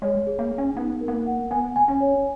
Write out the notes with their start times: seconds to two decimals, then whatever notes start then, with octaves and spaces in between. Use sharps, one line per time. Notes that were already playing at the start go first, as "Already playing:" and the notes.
0.02 G#3 C#5
0.27 G#4
0.39 A#3
0.51 G#4
0.58 C#4
0.76 B3 D#4
1.01 A#4
1.08 B3
1.13 A#3
1.26 F#5
1.51 B3 G#5
1.76 G#5
1.88 C#4
2.00 C#5